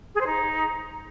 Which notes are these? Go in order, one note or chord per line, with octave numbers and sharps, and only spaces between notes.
G#4
C5
D#4